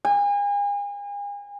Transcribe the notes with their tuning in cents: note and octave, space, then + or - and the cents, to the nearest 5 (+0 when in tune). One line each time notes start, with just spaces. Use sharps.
G#5 -40